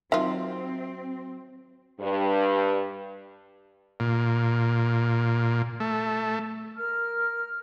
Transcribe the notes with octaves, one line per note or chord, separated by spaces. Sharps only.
D#3 F#3 C4 F4 E5
G2
A#2
A3
A#4 F6